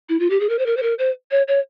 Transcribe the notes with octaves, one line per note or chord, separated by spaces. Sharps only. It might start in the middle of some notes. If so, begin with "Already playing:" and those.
E4
F4
G4
G#4
A#4
C5
A#4
C5
A#4
C5
C#5
C#5